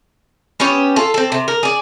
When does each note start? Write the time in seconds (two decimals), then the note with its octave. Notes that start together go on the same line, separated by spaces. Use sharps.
0.60 B3 C#4 G4 C#5
0.96 F4 A4
1.14 C4 A4
1.32 C3
1.48 A#4
1.63 G#4 D5